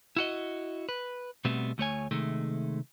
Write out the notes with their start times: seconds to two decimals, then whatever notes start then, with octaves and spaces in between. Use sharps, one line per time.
0.17 E4 F#4 D#5
0.89 B4
1.45 B2 G3 A3 B3 C4
1.78 D2 A3 C#5 G#5
2.11 C3 D#3 G#3 A3